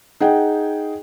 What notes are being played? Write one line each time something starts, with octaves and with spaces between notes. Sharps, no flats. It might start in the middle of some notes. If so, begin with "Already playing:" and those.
D#4 G#4 F#5 G5